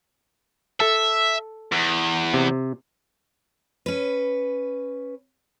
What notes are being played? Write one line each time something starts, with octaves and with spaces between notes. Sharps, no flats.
A4 E5 A5
E2
C3
C#4 B4